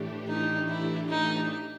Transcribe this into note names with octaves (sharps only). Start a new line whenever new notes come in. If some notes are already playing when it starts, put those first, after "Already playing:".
Already playing: A2 E3 A3 D4 G4
D#4
E4
D#4